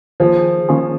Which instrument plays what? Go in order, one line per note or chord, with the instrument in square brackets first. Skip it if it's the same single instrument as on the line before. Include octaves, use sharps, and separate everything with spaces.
[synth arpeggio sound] D#3 A#3 F4 G#4 [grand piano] F3
[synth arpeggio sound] D#3 A#3 C#4 F4 G#4